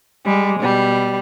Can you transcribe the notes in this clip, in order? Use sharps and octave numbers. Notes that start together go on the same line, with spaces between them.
G3 G#3
B2 G3